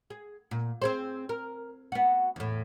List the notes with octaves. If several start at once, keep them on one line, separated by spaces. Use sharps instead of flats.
G#4
A#2
C4 G#4 C5
A#4
B3 F#4
E2 A2